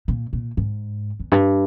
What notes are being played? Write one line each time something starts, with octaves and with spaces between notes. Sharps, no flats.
A#2
A#2
G#2
E2
G2